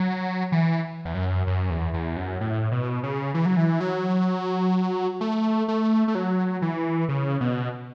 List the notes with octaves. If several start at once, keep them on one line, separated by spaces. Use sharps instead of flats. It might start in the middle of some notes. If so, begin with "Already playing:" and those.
Already playing: F#3
E3
E2
F#2
F#2
E2
E2
F#2
A2
B2
C#3
E3
F#3
E3
F#3
A3
A3
A3
F#3
E3
C#3
B2